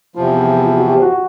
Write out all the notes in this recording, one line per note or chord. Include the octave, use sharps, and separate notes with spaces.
E2 C3 F3 F4
F4
F#4
G4
F#4